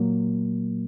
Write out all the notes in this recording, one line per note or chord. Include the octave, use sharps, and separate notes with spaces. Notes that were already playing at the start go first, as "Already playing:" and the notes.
Already playing: A#2 F#3 A#3